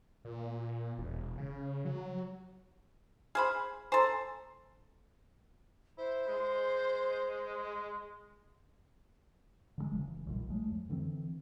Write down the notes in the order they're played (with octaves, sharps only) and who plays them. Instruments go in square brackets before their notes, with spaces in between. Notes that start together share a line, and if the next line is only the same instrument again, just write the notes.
[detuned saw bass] A#2
E1
C#3
F#3
[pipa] G#4 C5 B5 [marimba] F6
[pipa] A4 C5 [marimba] G#5 A#5 C6
[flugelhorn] E4 [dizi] C5
[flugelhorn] G#3
[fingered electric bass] D3 F3 G#3
F1 C#3 E3 F#3
B1 A#2 G3
F#3 G#3 A3
F2
D3 E3 A#3 C4